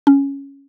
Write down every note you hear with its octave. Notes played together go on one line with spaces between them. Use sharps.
C#4